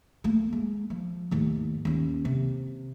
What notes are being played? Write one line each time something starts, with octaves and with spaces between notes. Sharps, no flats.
A3 A#3
G#3
F3
D#2 A2
D#2 C#4
C3